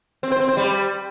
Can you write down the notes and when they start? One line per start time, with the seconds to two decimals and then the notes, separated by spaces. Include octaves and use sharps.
0.23 C4
0.32 C5
0.40 C4
0.49 C5
0.57 G3